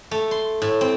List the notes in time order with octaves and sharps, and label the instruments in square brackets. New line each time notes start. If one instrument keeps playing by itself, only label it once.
[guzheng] A3
C6
A2
C4